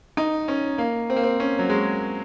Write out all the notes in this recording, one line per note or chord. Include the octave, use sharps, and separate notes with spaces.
D#4
C#4
A#3
C4
A#3
C4
C#4
F#3
G#3